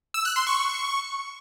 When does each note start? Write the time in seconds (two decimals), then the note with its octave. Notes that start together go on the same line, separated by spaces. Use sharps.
0.14 E6
0.25 F#6
0.36 C6
0.47 C#6